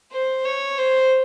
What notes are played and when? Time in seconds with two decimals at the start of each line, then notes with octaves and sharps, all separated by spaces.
0.12 C5
0.45 C#5
0.78 C5